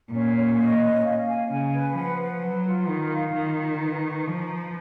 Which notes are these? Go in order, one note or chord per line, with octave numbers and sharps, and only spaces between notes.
A#2 C#4
C#4
D#5
C#4
F5
G#5
C#3 G#5
B4
F3 F#5
B4
F#3 F#5
F4
D#3 A#4
F5
D#3 F4
F4
B4
C#6
F3 A#5
B4